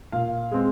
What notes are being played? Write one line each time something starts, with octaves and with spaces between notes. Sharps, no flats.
A#2 F5
G#3 C4